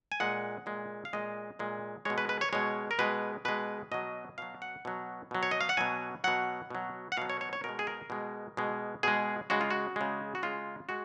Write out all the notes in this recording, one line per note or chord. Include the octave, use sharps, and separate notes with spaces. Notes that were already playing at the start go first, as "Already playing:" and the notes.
G#5
A#2 G#3 F#5
A#2 G#3
F5
A#2 G#3 D#5
A#2 G#3
B2 G#3 C#5
B4
B4
C#5
B2 G#3 C#5
A#4
B2 G#3 B4
B2 G#3 B4
B2 F#3 D#5
B2 F#3 F5
F#5
B2 F#3
B2 F#3
C#5
D#5
F5
F#5
B2 F#3 G#5
B2 F#3 F#5
B2 F#3
F#5
B2 F#3 F5
C#5
C#5
C#5
B2 G#3 A#4
G#4
A#4
B2 G#3
B2 G#3
B2 G#3 G#4
C#3 G#3 F#4
F4
F#4
C#3 G#3
F#4
C#3 G#3 F4
G#3 F#4